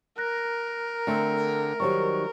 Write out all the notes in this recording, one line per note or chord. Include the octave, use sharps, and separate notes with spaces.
A#4 F#6 A#6
D3 A3 C4
D#3 F#3 G3 G4 C5 C#6